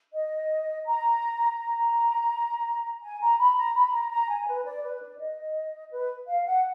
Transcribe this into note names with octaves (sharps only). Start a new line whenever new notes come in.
D#5
A#5
A#5
G#5
A#5
B5
A#5
B5
A#5
A#5
G#5
B4
D5
B4
D5
D#5
B4
F5
F#5